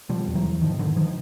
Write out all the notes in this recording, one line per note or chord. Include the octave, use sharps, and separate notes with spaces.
B2 F3 G3
E2
E3 F#3
E2
G#2 D#3 F3
G#2 D3 E3
D#3 F3